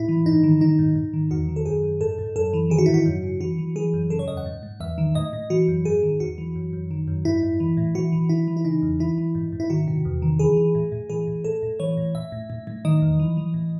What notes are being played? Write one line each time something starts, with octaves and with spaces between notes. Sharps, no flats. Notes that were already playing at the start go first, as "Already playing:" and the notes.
Already playing: A2 E4
E3
G#2 D#4
D#3
D#3 D#4
G#2
G#2
D#3
E2 F#4
D#3
A4
F#2 G#4
F#2
G#2 A4
G#2
F#2 A4
E3
D#3 G#4
F#4
G#2 E4
F#4
F#2
C#3
E3 F#4
E3
E3 G#4
F#2
C#3 A4
C#5
E2 D#5
F#5
G#2
G#2
E2 E5
D#3
A2 D#5
A2
E3 F#4
F#2
G#2 G#4
D#3
E2 F#4
E3
F#2
F#2
D#3
F#2
G#2 E4
G#2
E3
A2
E3 F#4
E3
E3 E4
E3
E4
C#3 D#4
E2
E3 E4
E3
G#2
G#2
E4
D#3 F#4
C3
E2
D#3
E3 G#4
E3
A2
A2
E3 G#4
A2
A2 A4
A2
E3 C#5
A2
A2 E5
A2
A2
A2
D#3 D#5
E2
E3
E3
A2